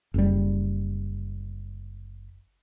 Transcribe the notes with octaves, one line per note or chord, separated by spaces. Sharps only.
F#1 G3